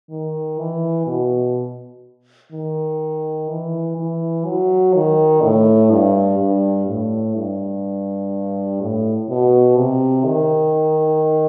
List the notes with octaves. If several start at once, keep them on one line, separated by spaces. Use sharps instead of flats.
D#3
E3
B2
D#3
E3
E3
F#3
D#3
A2
G2
G2
A2
G2
A2
B2
C3
D#3